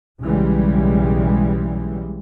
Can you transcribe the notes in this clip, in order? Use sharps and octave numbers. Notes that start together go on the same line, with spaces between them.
B1 C#3 E3 G3 G#3